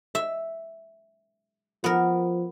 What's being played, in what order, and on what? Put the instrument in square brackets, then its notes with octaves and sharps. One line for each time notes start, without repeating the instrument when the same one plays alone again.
[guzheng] E5
[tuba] F3 [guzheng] B3 A#4